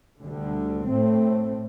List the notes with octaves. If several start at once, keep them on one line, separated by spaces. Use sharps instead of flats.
D2 D3 G3
A2 A3 C4